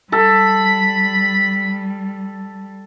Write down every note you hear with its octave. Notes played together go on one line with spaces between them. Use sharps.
G3 A4 B5